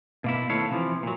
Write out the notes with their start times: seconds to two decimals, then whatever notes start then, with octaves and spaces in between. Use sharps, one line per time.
0.24 B2 A#3 E4
0.49 D#2 A3 E4 C#5 F5
0.70 C3 E3 F3
1.03 A#2 F#3